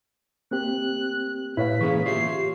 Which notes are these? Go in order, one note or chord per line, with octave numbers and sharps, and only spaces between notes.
A#3 C4 G4 F#6
A2 E4 B4 C#5 F5 B6
E3 A#3 C#4 G#4 F5 C#6
F4 G4 C#5 E5 C7